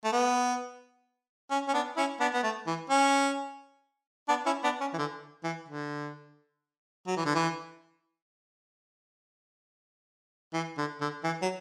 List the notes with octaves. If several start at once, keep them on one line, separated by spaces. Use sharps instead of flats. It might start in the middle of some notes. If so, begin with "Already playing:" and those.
A3
B3
C#4
C#4
B3 D4
C#4 E4
B3 D4
B3
A3
E3
C#4
B3 D4
C#4 E4
B3 D4
C#4
E3
D3
E3
D3
F#3
E3
D3
E3
E3
D3
D3
E3
F#3